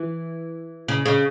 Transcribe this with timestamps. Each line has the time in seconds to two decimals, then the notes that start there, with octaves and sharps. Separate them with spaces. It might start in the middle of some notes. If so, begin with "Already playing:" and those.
Already playing: E3
0.88 C#3
1.05 C#3